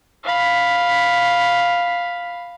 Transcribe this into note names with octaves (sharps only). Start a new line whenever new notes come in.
F5 B5